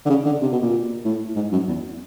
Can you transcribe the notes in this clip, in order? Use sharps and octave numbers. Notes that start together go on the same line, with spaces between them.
D3
C#3
D3
C3
B2
A#2
A2
G#2
F#2
E2